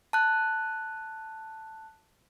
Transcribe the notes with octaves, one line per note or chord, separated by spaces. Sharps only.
A5 F#6